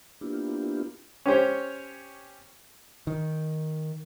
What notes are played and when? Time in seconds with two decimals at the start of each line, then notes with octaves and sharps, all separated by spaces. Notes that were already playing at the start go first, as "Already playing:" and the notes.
0.21 A#3 B3 D4 E4 F4 G4
1.26 C#4 G4 C5 C#5
3.07 D#3